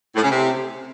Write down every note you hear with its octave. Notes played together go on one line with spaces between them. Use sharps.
A2
C#3
C3